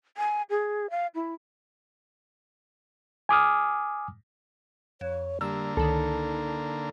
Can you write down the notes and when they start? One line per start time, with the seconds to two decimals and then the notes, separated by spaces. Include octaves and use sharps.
0.17 G#5
0.50 G#4
0.90 F5
1.15 E4
3.29 G#5 D6 D#6 F6
5.01 F2 C#5
5.41 D3 G3 A#3 E6
5.77 C#2 D#3 D#4 A4